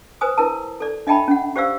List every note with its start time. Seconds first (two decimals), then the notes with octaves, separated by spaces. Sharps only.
0.21 B4 C5 G#5 D#6
0.38 E4 A#4 B4 A5
0.80 A4 D5
1.07 D4 D#5 E5 G5 A5 B5
1.28 C#4 F#5
1.56 G4 C5 D5 F5 E6